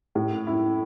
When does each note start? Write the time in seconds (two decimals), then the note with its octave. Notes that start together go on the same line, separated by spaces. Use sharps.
0.15 A2
0.47 E4